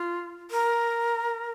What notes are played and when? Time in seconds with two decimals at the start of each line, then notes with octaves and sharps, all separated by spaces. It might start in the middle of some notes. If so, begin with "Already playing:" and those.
Already playing: F4
0.51 A#4